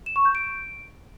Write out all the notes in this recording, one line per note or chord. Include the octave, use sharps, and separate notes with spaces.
E7
C#6
G6
D7